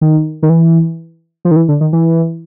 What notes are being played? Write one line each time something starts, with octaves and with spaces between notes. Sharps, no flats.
D#3
D#3
E3
F3
D#3
E3
D3
D#3
E3